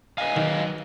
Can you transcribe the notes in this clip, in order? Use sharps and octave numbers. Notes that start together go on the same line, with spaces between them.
B4 D#5 F5 G#5
D#3 F#3 G5